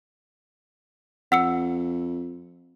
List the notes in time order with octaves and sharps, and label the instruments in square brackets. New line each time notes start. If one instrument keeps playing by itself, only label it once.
[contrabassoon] F2 [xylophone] F#5 E6 C#7